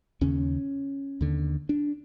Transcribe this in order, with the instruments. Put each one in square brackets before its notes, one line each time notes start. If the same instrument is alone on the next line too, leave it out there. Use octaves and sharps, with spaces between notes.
[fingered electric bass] D#2 C#3 C#4
D#2 D3
D4